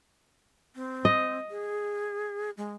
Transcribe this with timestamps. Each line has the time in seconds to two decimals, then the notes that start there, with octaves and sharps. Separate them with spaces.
0.75 C4
1.05 D#5
1.50 G#4
2.57 G#3